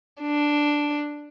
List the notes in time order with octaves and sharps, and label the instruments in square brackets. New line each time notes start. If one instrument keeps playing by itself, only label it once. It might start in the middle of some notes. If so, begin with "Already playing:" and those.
[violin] D4